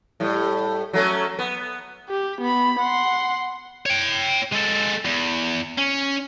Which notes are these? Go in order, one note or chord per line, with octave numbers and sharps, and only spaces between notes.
A2 G3
F#3 A3 C#4
B3
G4
B3 B5
F#5 C6
C#5 G5
G#3 A4
E2
C#4